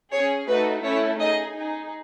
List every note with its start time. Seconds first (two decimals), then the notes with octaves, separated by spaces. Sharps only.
0.12 C#4 G#4 C#5
0.48 A3 D#4 F#4 A4 B4
0.83 A3 C#4 E4 A4 C#5
1.19 D#4 G#4 D#5
1.54 D#4 G#4